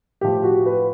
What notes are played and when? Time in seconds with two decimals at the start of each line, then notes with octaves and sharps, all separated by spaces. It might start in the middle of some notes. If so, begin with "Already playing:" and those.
0.21 A2 F3 G4
0.44 F#4
0.66 B4